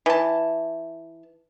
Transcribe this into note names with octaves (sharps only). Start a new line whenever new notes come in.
E3 A5